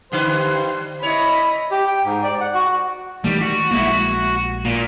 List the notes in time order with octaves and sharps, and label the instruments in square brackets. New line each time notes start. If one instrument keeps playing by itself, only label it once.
[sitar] G2 D3 B4 [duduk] C5
[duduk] E4 [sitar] C#5 [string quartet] D#5 B5
[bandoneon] G4
G5
G#2
D5
F#5
F#4
[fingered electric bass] D#3 E3 A3 [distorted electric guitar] G3
[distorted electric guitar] F#4
[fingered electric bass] A#1 G#3 A#3 [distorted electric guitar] E4 F#4
[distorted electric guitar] F#4
A#2